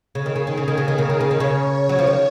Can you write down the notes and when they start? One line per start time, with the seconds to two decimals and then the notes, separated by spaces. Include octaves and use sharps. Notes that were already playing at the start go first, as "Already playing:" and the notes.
0.14 C#3 G#4
0.26 D#3
0.36 C#3
0.47 D#3
0.57 C#3
0.65 D#3 A#4
0.77 C#3
0.88 D#3
0.98 C#3
1.10 D#3
1.15 C#5
1.20 C#3
1.31 D#3
1.40 C#3
1.66 C#5
1.89 F#3
1.99 F3
2.07 D#3